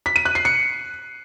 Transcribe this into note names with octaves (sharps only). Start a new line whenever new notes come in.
B6
D#7
F#6
C7
C#7